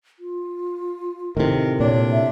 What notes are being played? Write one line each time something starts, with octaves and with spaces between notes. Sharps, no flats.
F4
A2 C3 D#3 A#4
A#2 D4 C#5
E5